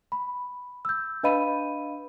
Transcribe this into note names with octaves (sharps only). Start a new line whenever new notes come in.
B5
E6 G6
D4 B4 D#5 F5 B5 D#7